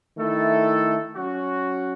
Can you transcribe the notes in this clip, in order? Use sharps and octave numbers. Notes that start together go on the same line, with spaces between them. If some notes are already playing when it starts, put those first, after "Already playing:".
D#3 A3 E4 A4
F#3 C#4 F#4